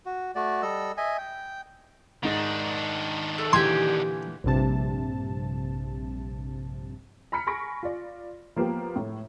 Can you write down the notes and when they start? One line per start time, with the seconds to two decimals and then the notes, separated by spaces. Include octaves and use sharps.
0.06 F#4
0.35 A3 F#4 D5
0.62 G3 A4 D#5 E6
0.97 D#5 E5 G#5
1.18 G5
2.23 G#2 D#3 D4 D#4 A6
3.38 A3
3.53 A#2 D3 E3 G4 G5 G#5 C6
4.44 A#1 G2 C3 A5
7.32 A#5 B5 F6 B6 C#7
7.47 G#5 B5 C#6 A#6 D7
7.83 F4 D5
8.56 F3 A#3 B3 G4
8.96 A2